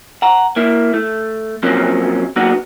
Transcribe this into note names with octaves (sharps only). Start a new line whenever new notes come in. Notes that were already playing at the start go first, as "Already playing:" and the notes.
F#5 A#5
A#3 E4
A3
C3 F3 F#3 A#3 C4 C#4
F#3 A#3 B3 D4 F#4